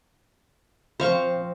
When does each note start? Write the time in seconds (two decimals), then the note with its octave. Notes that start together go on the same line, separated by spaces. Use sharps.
1.00 F3 C4 C5 F5 C#6